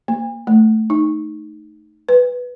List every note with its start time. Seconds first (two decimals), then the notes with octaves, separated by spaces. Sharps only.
0.08 A#3
0.47 A3
0.90 D#4
2.09 B4